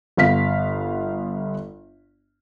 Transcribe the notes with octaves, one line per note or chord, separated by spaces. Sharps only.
G1 B3 F5 B6